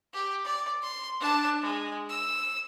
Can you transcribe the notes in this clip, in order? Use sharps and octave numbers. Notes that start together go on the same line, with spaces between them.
G4
D5
C6
D4 A5
G#3
E6